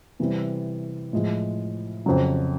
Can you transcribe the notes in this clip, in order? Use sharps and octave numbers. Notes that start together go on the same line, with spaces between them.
C3 E3 G3 C4
A2 F3 G#3
F2 C#3 F#3